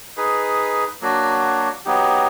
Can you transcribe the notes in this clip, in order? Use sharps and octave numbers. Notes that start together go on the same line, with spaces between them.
D#4 G#4 B4
F#3 A#3 D4 F#4
F#3 B3 D#4 G4